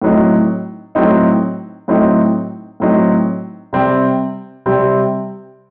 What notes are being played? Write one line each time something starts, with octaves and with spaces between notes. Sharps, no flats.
A2 F#3 C4 D#4
A2 F#3 C4 D#4
A2 F#3 C4 D#4
A2 F#3 C4 D#4
C3 G3 C4
C3 G3 C4